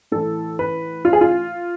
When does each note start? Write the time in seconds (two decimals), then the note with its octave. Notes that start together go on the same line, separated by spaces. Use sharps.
0.12 A2 E3 A4
0.59 B4
1.05 F4
1.13 G#4
1.21 F4